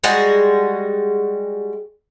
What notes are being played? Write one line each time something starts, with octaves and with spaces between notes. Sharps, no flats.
G3 G#3 F#4 G#4